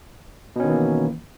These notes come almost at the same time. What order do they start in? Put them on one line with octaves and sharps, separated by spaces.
B2 C#4 D#3 E3 A#3